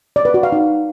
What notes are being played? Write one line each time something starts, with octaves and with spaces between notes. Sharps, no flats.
D5
B4
F#4
F5
D#4